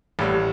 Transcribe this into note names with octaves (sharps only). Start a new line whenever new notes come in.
A1 A2 G3